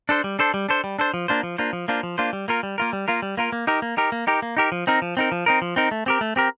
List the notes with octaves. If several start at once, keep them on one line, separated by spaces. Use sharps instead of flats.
D4 A4 C5
G3
D4 A4 C5
G3
D4 A4 C5
G3
D4 A4 C5
F3
A#3 D4 F4 C5
F3
A#3 D4 F4 C5
F3
A#3 D4 F4 C5
F3
A#3 D4 F4 C5
G3
A#3 F4 A#4
G3
A#3 F4 A#4
G3
A#3 F4 A#4
G3
A#3 F4 A#4
A#3
D#4 G4 A#4
A#3
D#4 G4 A#4
A#3
D#4 G4 A#4
A#3
D#4 G4 A#4
F3
C4 D#4 A#4
F3
C4 D#4 A#4
F3
C4 D#4 A#4
F3
C4 D#4 A#4
A3
C4 G4 A#4
A3
C4 G4 A#4